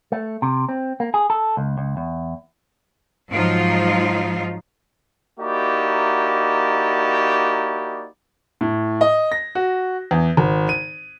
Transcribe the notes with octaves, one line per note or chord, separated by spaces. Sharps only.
A3
C3
C4
A#3
G#4
A4
C#2
C#2
E2
G#2 F3 F#3 D#4 F4
A#3 D#4 E4 F#4 G4 D5
A2
D#5
A#6
F#4
E2
G#1
D#7